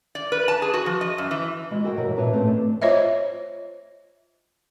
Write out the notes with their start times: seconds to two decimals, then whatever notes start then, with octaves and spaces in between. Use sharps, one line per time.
0.15 D5
0.32 B4
0.48 A5
0.62 G#4
0.74 F#4
0.86 F3
1.01 D#5
1.18 F#2
1.31 E3
1.71 G#3 E4 F#4
1.84 F#4 A4 A#4 D#5 F#5 G5
1.97 D2 G2 B2 E3 A#4 C#5
2.16 A#2 D4 B4 C#5 D#5 E5
2.33 G#2 E3 A3 C4 C#4 F4
2.47 D4
2.82 F4 C5 C#5 D#5 E5